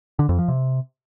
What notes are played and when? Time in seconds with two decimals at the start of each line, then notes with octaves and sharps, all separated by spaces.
0.19 D3
0.29 F2
0.39 F3
0.48 C3